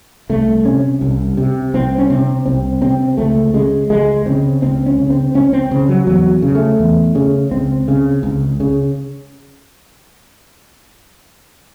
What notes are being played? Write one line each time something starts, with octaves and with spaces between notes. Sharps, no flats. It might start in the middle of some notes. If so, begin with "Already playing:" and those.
C2 A3
C3 C#4
C2
C3
C2 C4
C#4
C3 C4
C2 C4
C3 C4
C#2 A3
C#3 G#3
C#2 G#3
C#3 C4
C#2 C4
C#4
C#3
C4
C#2 C#4
C4
C#3
F#3
E2 F#3
C#3
A3
E2
C#3
C#2 C4
C#3
C#2
C#3